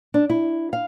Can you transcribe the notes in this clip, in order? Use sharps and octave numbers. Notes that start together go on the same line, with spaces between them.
D4
E4
F5